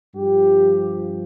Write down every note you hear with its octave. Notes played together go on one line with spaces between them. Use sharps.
G2 F3 G4